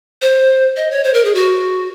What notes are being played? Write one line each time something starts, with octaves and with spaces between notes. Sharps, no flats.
C5
D#5
C#5
C5
A#4
G#4
F#4